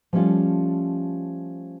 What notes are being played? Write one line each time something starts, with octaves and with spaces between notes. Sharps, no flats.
F3 G3 A3 C#4 F4